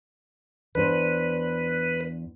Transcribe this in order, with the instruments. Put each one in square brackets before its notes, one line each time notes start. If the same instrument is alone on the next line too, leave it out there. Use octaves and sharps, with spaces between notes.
[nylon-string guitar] E2 D4 C5 [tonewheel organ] B4